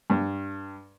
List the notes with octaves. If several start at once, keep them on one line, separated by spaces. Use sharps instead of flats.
G2